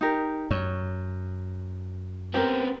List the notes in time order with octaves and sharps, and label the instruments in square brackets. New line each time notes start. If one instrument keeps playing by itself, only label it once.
[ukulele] D#4 G4 A#4
[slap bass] F#2 [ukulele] C#5
[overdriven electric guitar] B3 C4 [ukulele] G4 A#4